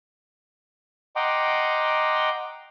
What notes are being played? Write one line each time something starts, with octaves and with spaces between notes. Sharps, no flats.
D#5 F#5 G5 A#5 C6 D6